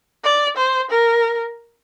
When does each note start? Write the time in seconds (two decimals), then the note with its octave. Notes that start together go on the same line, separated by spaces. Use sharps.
0.24 D5
0.57 C5
0.91 A#4